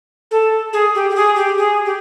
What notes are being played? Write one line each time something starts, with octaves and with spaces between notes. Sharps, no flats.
A4
G#4
G4
G4
G#4
G4
G#4
G4